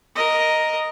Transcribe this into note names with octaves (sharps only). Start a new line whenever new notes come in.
A#4 D#5